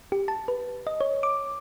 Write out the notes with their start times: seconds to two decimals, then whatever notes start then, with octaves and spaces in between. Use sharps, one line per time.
0.12 G4
0.28 A5
0.48 B4
0.87 D#5
1.01 C#5
1.23 D6